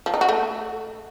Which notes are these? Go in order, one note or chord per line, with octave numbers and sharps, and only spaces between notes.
F3
D#4
F#4
A3